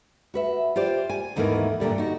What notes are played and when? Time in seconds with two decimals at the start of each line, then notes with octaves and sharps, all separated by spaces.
0.34 F#4 B4 E5
0.76 F4 G4 C5 D5
1.10 G#5
1.36 D#2 G#2 E3 A3 B3 A#4
1.80 G2 A#2 D3 G3
1.98 D#4 F#4